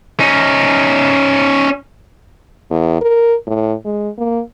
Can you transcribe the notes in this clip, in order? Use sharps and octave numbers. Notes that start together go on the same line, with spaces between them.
C#4 D#4
E2
A#4
A2
G#3
A#3